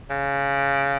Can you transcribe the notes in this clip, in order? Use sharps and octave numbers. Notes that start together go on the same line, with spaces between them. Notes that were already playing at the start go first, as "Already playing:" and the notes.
C#3